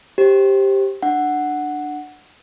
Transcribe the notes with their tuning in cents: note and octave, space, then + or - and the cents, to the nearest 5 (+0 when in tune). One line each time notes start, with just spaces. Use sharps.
G4 +0 C5 +20
D4 +20 F#5 +0